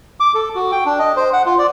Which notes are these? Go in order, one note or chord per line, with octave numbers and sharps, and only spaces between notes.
D6
A4
F#4
G5
D4
D#5
C5
F#5
F4
D5